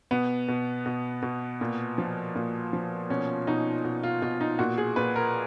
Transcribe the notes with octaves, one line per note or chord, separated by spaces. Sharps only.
B2 B3
B2
B2
B2
A#2
F3
A#2
F3
B2 C#4
B2 D#4
B2
F4
B2 F4
D#4
A#2 F#4
G#4
A#2 B4
A#4